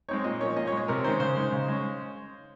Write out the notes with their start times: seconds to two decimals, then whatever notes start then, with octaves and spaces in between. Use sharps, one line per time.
0.09 G#3 C4 D#4 C#5
0.24 A#2 D#5
0.41 F3 A#3 C#4 C#5
0.56 A#2 D#5
0.67 C#5
0.72 G#3
0.77 C#4
0.88 C3 A#4
1.04 D#3 G#3 C#4 C5
1.20 C#3 C5
1.36 G#3 D#4
1.52 C#3
1.68 G#3 C#4